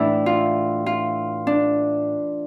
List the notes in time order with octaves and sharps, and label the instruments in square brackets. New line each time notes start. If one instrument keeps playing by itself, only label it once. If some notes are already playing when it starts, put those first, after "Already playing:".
Already playing: [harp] A2 E3 D4 E4
F4
F4
D4